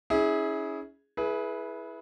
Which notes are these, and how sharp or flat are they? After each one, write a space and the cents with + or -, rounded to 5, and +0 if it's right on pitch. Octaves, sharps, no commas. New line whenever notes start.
C#4 +15 E4 -30 G#4 +0
E4 +0 G#4 +25 B4 -15